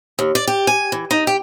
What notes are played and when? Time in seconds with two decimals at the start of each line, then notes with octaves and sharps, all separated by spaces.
0.19 D#2
0.35 D5
0.47 G4
0.67 G#5
0.92 E3
1.11 D#4
1.27 G4